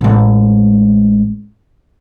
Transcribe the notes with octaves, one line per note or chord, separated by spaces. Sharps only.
A1 G#3